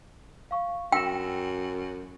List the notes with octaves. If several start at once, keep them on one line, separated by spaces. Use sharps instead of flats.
F5 C#6
F#2 G5 E6 A#6 E7